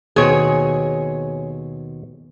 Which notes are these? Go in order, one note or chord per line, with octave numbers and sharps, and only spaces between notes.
D#2 B2 C4 G#4 C#5